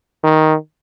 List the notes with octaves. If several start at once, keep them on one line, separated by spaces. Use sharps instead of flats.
D#3